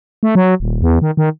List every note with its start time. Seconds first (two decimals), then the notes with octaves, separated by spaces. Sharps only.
0.23 A3
0.35 F#3
0.60 D#1
0.82 E2
1.02 D#3
1.17 D#3